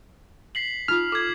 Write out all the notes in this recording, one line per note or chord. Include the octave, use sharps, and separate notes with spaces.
B6 C7 F#7
D#4 F4 D#6 F6
A4 D6 G#6